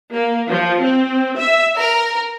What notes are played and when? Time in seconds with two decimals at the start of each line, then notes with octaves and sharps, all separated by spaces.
0.12 A#3
0.49 F3
0.82 C4
1.37 E5
1.77 A#4